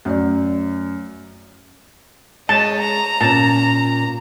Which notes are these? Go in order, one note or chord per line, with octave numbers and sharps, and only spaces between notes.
F#2 A3 C#5 D5
G#3 C#5 D#5 A5
A#5
A#2 C#4 A5